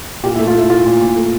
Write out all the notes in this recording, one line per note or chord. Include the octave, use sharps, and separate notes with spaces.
A#2 G4
E4
A3
F4
A3 E4
A3 F4
A#2
A#2
A3